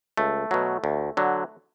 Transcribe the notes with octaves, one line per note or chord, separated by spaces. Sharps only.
C#2 A3
B2 F#3
D2
D3 F#3